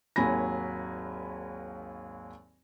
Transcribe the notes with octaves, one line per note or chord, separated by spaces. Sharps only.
G#1 D#2 F#3 G#5 B5 A#6